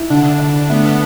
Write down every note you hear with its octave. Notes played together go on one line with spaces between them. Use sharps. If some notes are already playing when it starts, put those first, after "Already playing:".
Already playing: E4
D3 D4
D3
A3 B3
B3